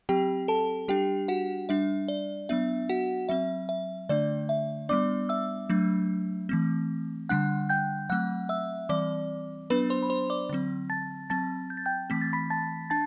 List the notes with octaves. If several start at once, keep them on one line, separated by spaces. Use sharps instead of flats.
F#3 C4 G4 G5
A4 A5
G3 D4 G4 G5
F#4 F#5
G3 D4 E5
D5
F#3 B3 D4 E5
F#4 F#5
F#3 C4 E5
E5
D3 A3 D4 D5
E5
G3 B3 D4 D5 D6
E5 E6
F#3 A3 D4
E3 A3 C4
D3 G3 D4 F#5 F#6
G5 G6
F#3 A3 C4 F#5 F#6
E5 E6
E3 G3 C4 D5 D6
F#3 B3 D4 B4 B5
C5 C6
B5
C5 C6
D5 D6
D3 F#3 C4
A5 A6
F#3 C4 A5 A6
G6
A6
G5 G6
E3 A3 C4 B6
A6
B5 B6
A5 A6
D4 A5 A6